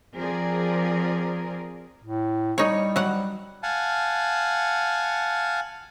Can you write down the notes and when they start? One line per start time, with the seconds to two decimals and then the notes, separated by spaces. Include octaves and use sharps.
0.15 F3 C4 G#4 A#4 D5
2.04 A2
2.58 G3 D#4 C#5
2.96 F#3 F#5
3.63 F5 F#5 G#5 A5